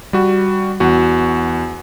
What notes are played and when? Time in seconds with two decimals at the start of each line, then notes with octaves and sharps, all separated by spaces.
0.13 G3 F#4
0.80 E2 F#4